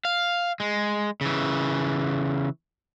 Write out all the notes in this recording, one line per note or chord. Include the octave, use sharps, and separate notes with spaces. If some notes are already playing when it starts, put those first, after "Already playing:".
F5
G#3
C#3 E3